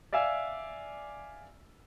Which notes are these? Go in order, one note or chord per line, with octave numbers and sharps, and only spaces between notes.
D5 E5 F5 G#5 E6